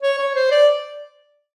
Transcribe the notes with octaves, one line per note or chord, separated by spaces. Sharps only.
C#5
C#5
C5
D5